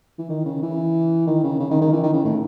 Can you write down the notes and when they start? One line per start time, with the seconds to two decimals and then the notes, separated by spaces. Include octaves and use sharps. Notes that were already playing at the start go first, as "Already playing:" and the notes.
0.18 E3
0.29 D#3
0.45 C#3
0.62 E3
1.27 D#3
1.44 C#3
1.60 C#3
1.71 D#3
1.81 D#3
1.93 E3
2.03 D#3
2.13 C#3
2.25 A2